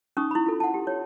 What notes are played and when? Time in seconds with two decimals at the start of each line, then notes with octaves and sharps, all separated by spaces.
0.17 C#4 D#4 C#6 D#6
0.31 E4 B5
0.46 F4 A4
0.60 F#5 A5
0.74 G4
0.87 C#5